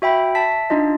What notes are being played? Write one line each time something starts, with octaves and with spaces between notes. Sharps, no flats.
F#4 E5 G5 B5
E5 A5 B6
D4 D#4 F4 D#5